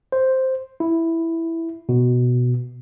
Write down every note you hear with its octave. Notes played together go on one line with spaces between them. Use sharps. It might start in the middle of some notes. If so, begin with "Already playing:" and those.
C5
E4
B2